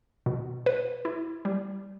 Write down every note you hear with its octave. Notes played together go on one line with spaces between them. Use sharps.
B2
B4
E4
G3